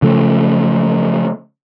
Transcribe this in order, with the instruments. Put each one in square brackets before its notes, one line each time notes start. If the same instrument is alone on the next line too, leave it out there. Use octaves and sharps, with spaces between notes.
[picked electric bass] C#3 F3 A3